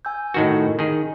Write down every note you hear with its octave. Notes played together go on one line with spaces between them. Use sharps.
G#5 E6 G6
A2 D#3 F#4 A#4 D#5
D#3 G#4